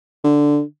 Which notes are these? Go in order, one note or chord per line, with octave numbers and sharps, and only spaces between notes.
D3